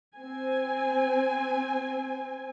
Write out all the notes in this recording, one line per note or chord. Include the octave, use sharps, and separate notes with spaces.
C4 G#5